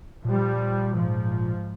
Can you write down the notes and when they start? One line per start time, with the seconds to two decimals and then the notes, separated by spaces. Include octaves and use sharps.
0.25 A#2 F3 G3
0.94 G#2 F3